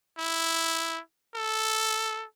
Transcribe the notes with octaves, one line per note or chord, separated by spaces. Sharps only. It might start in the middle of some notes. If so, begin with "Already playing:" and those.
E4
A4